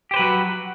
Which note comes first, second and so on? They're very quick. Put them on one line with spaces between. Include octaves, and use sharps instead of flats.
G4 C5 B4 F#3 F#4